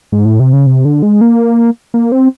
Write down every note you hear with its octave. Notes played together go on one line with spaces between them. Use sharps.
G#2
A2
C3
C#3
C3
D3
G#3
A#3
A#3
C4